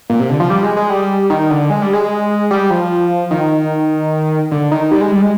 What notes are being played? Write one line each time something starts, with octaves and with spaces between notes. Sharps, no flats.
A#2
C3
D3
F3
G3
G#3
G#3
G3
D#3
D3
G#3
G3
G#3
G3
F3
D#3
D3
D#3
G3
G#3
G3
G#3